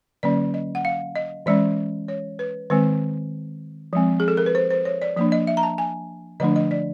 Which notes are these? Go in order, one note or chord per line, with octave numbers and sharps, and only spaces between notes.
D3 F#3 A#3 C#4 D5
D#5
F#5
F5
D#5
E3 G#3 C#4 D5
C#5
B4
D#3 G#3 C4 B4
F3 G#3 C4
G#4
A4
A#4
B4
C5
C5
C#5
D5
F3 A#3 D4 D5
D#5
E5
A#5
A5
G#5
D3 F3 A3 D4 D#5
D#5
D5